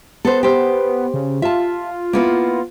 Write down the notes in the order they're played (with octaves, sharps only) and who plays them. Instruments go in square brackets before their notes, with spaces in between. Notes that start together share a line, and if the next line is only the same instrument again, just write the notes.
[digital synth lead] B3 [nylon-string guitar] A4 C5
[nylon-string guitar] G4 C5
[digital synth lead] C#3
[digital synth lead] F4 [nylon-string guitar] E5 A5
[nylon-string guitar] A#3 B3 E4